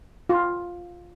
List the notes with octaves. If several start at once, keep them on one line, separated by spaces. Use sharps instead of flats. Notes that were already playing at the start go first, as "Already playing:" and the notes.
F4